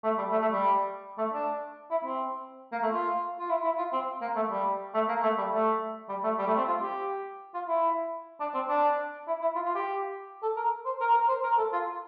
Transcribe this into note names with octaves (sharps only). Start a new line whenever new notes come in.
A3
G3
A3
A3
G3
A3
D4
E4
C4
A#3
A3
F4
F4
E4
E4
F4
C4
A#3
A3
G3
A3
A#3
A3
G3
A3
G3
A3
G3
A3
C4
F4
G4
F4
E4
D4
C4
D4
E4
E4
F4
F4
G4
A4
A#4
C5
A#4
A#4
C5
A#4
A4
F4